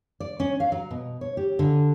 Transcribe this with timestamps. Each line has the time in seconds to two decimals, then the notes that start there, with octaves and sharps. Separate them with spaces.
0.20 D5
0.40 C#4
0.60 F5
0.72 F#3
0.91 B2
1.21 C#5
1.37 G4
1.59 D3